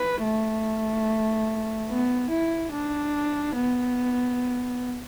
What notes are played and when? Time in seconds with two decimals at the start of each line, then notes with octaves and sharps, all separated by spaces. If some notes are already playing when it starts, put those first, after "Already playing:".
Already playing: B4
0.23 A3
1.89 B3
2.30 E4
2.72 D4
3.55 B3